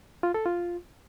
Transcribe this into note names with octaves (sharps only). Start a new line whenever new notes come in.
F4
A4
F4